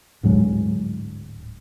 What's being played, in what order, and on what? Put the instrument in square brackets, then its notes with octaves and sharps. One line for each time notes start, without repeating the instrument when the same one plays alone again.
[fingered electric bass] D1 G#2 F#3 G#3